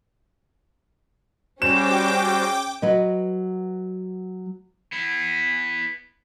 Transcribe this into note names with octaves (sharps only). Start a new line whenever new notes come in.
G3 C#4 F#4 G#4 C5 G5 D6 E7
F#3 B4 D#5
B3 E4